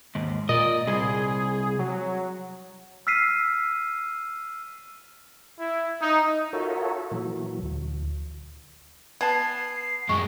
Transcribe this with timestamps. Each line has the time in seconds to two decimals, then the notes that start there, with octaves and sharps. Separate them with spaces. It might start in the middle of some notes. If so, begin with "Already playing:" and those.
0.15 D#2 G#2
0.49 A#2 D5 D#5
0.87 C2 G#4
1.79 F#3
3.07 E6 F6 B6 C7 D#7
5.58 E4
6.01 D#4
6.53 F4 F#4 A4 A#4 C#5 E5
7.11 A#2 E3 F#3
7.63 D2
9.21 B3 A5 G#6 C7
10.09 F#2 G#3 C#6